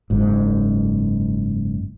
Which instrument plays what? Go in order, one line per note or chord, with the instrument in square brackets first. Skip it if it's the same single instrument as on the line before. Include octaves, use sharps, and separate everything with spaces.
[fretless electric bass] F#1 G#2